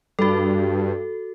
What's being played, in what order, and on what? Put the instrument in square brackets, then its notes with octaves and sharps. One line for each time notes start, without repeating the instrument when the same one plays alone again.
[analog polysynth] G2 [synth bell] F#4 A4